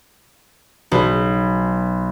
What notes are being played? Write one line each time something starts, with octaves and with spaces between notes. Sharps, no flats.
B1